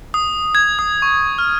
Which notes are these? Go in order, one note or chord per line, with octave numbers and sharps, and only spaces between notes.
D#6
G#6
D#6
C#6
F6